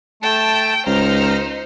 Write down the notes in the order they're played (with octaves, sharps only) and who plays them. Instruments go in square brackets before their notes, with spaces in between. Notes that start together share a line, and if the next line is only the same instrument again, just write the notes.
[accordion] A3 A5 [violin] G5 D7
[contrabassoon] C#2 [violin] D#4 C5 [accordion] A#5 F6